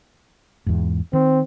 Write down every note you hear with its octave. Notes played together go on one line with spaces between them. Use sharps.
E2 G#2
D#3 C4